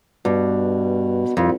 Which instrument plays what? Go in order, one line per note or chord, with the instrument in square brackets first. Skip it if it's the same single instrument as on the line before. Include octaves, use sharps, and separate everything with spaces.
[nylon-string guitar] G2 [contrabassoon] B2
[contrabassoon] C2 [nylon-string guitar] F2